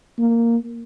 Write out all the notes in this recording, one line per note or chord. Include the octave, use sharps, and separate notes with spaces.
A#3